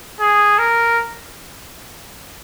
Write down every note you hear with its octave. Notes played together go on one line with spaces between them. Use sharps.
G#4
A#4